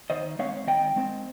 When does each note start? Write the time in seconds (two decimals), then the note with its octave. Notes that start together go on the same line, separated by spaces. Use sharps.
0.10 D#3 C5 D#5
0.39 G#3 C4 C#5 F5
0.67 D#3 D#5 G5
0.96 G#3 C4